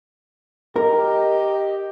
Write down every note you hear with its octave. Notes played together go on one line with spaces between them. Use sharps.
G4 A#4 D#5